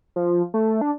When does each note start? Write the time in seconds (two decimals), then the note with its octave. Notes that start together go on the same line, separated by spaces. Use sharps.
0.16 F3
0.54 A3
0.81 D4